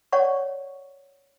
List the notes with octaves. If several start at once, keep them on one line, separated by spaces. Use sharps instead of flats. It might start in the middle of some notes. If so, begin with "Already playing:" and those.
C#5 D5 F#5 C#6